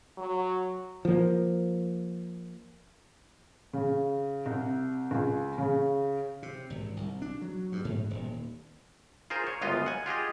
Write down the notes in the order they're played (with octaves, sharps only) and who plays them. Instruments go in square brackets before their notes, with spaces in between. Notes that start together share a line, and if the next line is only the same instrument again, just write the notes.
[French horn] F#3
[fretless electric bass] F3 A#3
[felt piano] C#3
C2
C#2
C#3
[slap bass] C3
G#1
C2
D4
F#3
G2
G#2
D#1
[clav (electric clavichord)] F4 G#4 A#4 C5
C#5
G1 C#2 F#2 B3 F4 D#5
F#5 G#5
F4 G4 G#4 D#5